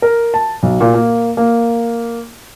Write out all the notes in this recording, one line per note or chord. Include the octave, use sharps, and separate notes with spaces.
A#4
A5
B1
A#2
A#3
A#3